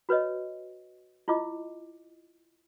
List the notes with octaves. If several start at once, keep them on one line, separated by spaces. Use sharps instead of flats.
F#4 B4 C#5 D#5
E4 F4 D#5 D6